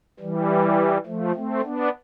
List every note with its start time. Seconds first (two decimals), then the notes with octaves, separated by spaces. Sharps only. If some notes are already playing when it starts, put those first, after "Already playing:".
0.20 E3 G3
1.06 F3 A3
1.35 A3 C4
1.64 B3 D4